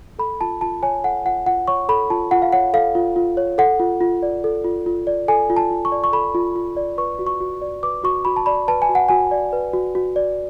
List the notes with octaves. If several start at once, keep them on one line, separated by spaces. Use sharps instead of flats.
A4 B5
F4 A5
F4 A5
C#5 G#5
A4 F#5
F4 F#5
F4 F#5
C#5 C#6
A4 B5
F4 A5
F4 F#5
F5
C#5 F#5
A4 F5
F4
F4
C#5
A4 F#5
F4
F4
D5
A4
F4
F4
D5
A4 G#5
F4
A5
F4
C#6
D5
C#6
A4 B5
F4
F4
D5
B4 C#6
F#4
C#6
F#4
D5
B4 D6
F#4 C#6
F#4 B5
A5
D5 B5
B4 A5
G#5
F#4
F#5
F#4 G#5
D5
B4
F#4
F#4
D5